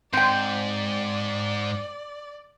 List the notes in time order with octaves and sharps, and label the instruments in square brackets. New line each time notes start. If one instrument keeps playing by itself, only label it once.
[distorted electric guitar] G#2 [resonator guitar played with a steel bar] C4 G5 [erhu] D5